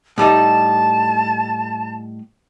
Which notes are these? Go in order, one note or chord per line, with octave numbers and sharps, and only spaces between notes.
A2 G3 D#4 A5